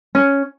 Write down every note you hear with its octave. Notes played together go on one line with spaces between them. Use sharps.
C#4